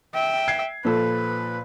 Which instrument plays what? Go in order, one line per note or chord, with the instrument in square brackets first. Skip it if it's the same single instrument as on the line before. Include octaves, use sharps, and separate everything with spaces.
[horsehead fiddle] E5 G5
[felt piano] G#6 C7
[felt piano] A#2 F3 A4 [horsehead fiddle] B4